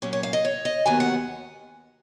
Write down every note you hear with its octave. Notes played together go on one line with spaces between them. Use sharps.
A#2 F#3 C#4 C#5
C#5
F5
D#5
C#5
D#5
D#2 D#3 F#3 B3 G#5
F#5